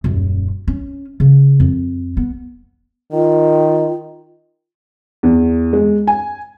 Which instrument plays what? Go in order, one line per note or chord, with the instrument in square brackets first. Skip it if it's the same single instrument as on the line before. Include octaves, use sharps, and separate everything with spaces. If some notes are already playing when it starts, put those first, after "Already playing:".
[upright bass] D#1 F#2
C#4
C#3
F2
B3
[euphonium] D#3 [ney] F4
[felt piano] E2
G#3
G#5